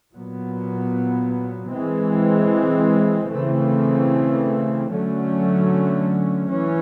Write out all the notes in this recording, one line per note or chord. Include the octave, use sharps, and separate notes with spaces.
A#2 F#3 B3
E3 G#3 C4
C#3 E3 A3 C4
D3 F#3 A3 C#4
E3 C#4